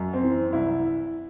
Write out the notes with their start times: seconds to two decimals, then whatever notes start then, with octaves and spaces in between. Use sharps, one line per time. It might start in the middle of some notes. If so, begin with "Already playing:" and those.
Already playing: F#2
0.13 C4
0.23 E3
0.53 C2 E4